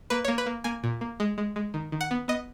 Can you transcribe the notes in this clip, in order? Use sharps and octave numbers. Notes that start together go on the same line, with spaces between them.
A#3 B4
A#3 C#5
B4
A#3
A#3 G#5
A#2
A#3
G#3
G#3
G#3
D#3
D#3
F#5
B3
B3 D#5